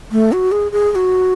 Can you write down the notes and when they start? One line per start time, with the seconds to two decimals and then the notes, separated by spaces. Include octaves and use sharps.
0.12 A3
0.32 F#4
0.52 G#4
0.72 G#4
0.92 G#4
0.95 F#4